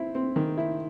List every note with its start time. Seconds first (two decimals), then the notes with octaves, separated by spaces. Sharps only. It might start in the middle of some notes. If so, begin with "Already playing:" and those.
Already playing: C4 E4
0.15 C4
0.36 D#3
0.58 E4